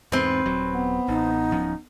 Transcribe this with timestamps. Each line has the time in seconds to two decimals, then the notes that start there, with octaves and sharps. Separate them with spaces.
0.12 E2 G#2 C4 B4
0.45 D#1 F#3
0.74 B3
1.08 A1 D#4
1.51 D1 F3 C#4